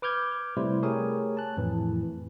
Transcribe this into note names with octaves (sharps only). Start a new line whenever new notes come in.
B4 D6 F6 G6 G#6
C3 G3 A3 E4 C5
A3 G4 G#4 A#4 C#5 G#5
A5 F#6
F2 A2 E3